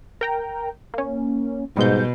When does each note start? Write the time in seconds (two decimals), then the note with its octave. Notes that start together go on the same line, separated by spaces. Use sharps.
0.21 A#4 G5 A#5
0.94 A#3 C#4
1.77 G#2 B2 G3 G#3 G6